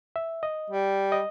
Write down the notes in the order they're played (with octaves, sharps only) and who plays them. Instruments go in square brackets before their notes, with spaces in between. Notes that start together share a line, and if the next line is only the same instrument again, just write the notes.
[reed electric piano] E5
D#5
[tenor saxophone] G3
[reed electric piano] D#5